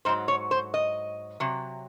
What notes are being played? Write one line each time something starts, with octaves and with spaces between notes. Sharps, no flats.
G#2 F#3 C5
C#5
C5
D#5
C3 F#3